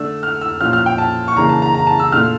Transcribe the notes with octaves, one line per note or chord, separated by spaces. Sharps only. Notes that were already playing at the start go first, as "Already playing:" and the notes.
Already playing: D3 A3 D4 E6
F6
E6
A#2 F3 C#4 F6
F6
G5
A5
C#6
C#3 E3 A#3 D4 A#5
A5
A#5
A#5
A5
E6
A#2 A3 D4 F6